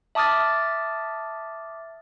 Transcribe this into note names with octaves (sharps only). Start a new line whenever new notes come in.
E5 A5 D6 D#6 F6 A6